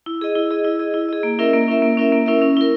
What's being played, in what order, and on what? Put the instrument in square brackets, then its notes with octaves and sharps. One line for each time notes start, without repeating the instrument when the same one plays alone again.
[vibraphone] E4
G#4 D#5
E4
G#4 D#5
E4
G#4 D#5
E4
G#4 D#5
A#3
C#4 E4 A#4 E5
A#3
C#4 E4 A#4 E5
A#3
C#4 E4 A#4 E5
A#3
C#4 E4 A#4 E5
C#4
E4 A#4